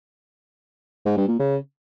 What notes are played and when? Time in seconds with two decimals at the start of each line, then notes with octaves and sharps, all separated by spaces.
1.06 G#2
1.17 G2
1.28 A#2
1.39 C#3